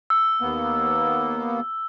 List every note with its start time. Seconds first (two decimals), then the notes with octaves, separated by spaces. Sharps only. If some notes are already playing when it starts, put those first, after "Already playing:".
0.10 E6
0.41 D#2 A#3 B3